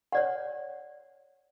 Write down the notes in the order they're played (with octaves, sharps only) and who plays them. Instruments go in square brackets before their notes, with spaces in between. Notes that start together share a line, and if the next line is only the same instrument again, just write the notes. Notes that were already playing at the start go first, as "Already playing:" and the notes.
[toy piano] C#5 D5 F#5